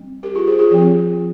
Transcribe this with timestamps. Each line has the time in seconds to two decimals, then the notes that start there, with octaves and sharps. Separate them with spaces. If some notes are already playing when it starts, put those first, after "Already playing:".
Already playing: G3 C4
0.23 G4 A#4
0.35 F4 G#4
0.47 G#4 C5
0.59 F4 G#4
0.71 F3 C4 F4 G#4